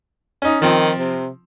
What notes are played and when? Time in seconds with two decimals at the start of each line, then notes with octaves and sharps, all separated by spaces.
0.42 C#4 D#4
0.62 D#3 F3 C4
0.98 C3